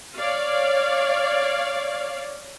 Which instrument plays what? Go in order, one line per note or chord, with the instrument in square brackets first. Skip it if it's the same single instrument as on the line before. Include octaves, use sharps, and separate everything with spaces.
[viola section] C#5 D5 F5